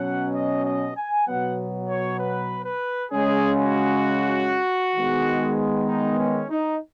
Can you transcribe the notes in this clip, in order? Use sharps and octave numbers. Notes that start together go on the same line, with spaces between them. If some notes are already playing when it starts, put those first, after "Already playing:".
Already playing: B2 F#3 C#4 F#5
D#5
D#5
G#5
B2 F#3 B3 F#5
C#5
B4
B4
C#3 G#3 C#4 G#4
F#4
D#3 G#3 B3
D#4
C#4
D#4